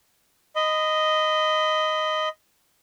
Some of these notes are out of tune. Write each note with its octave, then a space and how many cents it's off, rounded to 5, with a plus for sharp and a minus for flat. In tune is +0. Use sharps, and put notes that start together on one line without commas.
D#5 +0 B5 +25